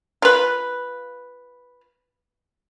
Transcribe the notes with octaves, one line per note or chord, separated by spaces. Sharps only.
F4 B4